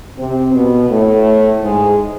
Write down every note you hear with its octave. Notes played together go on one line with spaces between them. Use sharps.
C3 C4
B2 B3
A2 A3
G#2 G#3